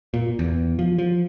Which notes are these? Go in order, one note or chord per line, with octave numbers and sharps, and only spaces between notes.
A#2
E2
F3
F3